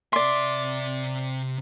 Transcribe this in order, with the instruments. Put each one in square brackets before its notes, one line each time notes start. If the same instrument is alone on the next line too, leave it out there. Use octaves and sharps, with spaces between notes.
[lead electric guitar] C3 E5 [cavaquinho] D5 C6